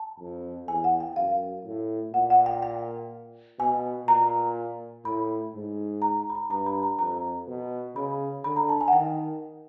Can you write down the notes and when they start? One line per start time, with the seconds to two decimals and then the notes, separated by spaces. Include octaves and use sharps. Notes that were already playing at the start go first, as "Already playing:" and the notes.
Already playing: A5
0.20 F2
0.68 E2 G#5
0.84 F#5
1.00 G5
1.16 F#2 F5
1.65 A2
2.14 A#2 F#5
2.30 F#5
2.46 G5
2.63 G5
3.59 B2 G#5
4.08 A#2 A#5
5.05 A2 B5
5.54 G#2
6.02 A#5
6.30 B5
6.35 A#5
6.50 G2 A#5
6.66 B5
6.76 A5
6.83 A#5
6.99 F2 A#5
7.47 B2
7.96 C#3 B5
8.44 D3 B5
8.56 A#5
8.69 A5
8.81 G#5
8.88 F#5
8.93 D#3 G5